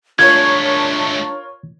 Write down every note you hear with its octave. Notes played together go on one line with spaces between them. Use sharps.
G#3 A3 D4 F4 A#4 C#5 G#6